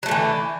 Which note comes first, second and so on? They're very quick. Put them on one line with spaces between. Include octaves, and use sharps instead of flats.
F#3 A3 D3 E3